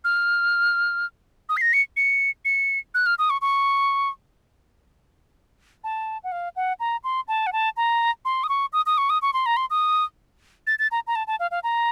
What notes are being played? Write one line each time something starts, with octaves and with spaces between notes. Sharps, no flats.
F6
D#6
C7
A#6
C#7
C#7
C#7
F#6
F6
D#6
C#6
C#6
A5
F#5
F5
F#5
A#5
C6
A5
F#5
A5
A#5
C6
D#6
C#6
D#6
D#6
C#6
D#6
C#6
C6
A#5
C6
D#6
A6
A6
A#5
A#5
A5
A5
F5
F5
A#5